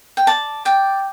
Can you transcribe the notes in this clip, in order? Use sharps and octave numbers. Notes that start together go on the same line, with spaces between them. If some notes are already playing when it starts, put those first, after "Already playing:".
G5
D5 A5
D5 G5